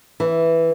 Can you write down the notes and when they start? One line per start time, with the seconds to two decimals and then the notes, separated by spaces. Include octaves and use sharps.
0.20 E3